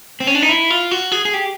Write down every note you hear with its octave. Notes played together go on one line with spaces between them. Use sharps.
C4
C#4
D4
D#4
E4
F4
F#4
G#4
G#4
G4